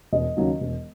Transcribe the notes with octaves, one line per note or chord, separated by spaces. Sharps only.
E1 D#5
D#2 C#3 F#3
E1